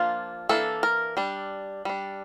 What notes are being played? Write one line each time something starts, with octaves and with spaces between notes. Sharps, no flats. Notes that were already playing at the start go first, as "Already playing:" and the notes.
Already playing: F3 A#3 D4 F4
E3 A#3 D4 A4
A#4
G3 D4
G3 D4